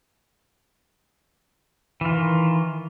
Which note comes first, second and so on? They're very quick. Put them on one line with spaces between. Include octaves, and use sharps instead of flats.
E3 F4 D#3